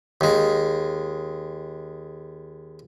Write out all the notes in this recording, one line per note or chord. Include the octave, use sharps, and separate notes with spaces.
D#2 G#3